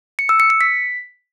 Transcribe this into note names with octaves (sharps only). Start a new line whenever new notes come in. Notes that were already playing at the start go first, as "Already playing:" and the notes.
C#7
E6
C#7
C#7
B6